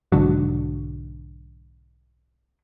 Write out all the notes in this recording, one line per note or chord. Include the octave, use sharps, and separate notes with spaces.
B1 G#2 D3 F#3